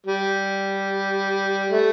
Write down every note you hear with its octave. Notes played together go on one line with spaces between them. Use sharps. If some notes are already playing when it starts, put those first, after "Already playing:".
G3
A3